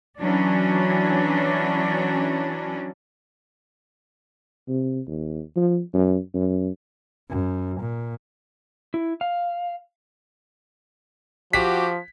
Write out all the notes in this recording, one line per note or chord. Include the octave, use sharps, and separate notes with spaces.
E3 F#3 C#4 D4
C3
D#2
F3
F#2
F#2
F#2
A#2
E4
F5
F3 F#4 G4 B6